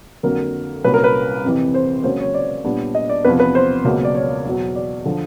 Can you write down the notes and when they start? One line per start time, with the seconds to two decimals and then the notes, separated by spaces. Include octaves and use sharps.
0.23 F2 D3 F#3 A#3 A#4
0.84 C2 A#2 F#3 A#3 C#4 B4
0.94 A#4
1.04 B4
1.43 F2 C3 E3
1.74 C5
2.04 C#2 C#3 F#3 A#3 C#4 C5
2.20 C#5
2.34 D5
2.64 A#2 G3 B3 D4
2.95 D#5
3.09 D5
3.25 E2 C3 F3 B4
3.40 B4
3.55 C5
3.84 C#2 B2 F#3 A#3
4.05 D5
4.15 C#5
4.45 E2 B2 F#3
4.76 D5
5.05 D3 F3